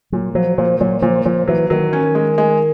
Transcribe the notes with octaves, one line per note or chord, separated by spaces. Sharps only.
A#2 F#3
F3 F#3
A#2 F3
A#2 F#3
A#2 F3
A#2 F3
E3 F#3
D#3 F#3
C#4
G#3
G#3